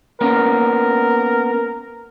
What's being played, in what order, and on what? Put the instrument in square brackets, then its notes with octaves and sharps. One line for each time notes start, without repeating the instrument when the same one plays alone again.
[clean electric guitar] A#3 B3 C#4 [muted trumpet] A#4